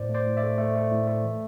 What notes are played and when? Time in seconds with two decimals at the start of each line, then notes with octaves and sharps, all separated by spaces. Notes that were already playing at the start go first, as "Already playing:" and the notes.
Already playing: A2 C5 D5
0.09 A3
0.14 C5 D5
0.27 A2
0.37 D5 E5
0.43 A3
0.58 A3
0.76 A3
0.91 A2
1.07 A3
1.25 E3